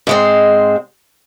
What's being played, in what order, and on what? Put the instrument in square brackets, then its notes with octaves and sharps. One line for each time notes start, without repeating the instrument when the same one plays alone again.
[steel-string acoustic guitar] G#2 G#3 C4